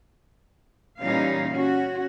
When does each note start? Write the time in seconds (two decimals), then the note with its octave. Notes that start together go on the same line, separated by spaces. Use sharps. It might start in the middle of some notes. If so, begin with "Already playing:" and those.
1.01 A#2 E3 G3 C#4 D#4 F5
1.52 C#4 F#4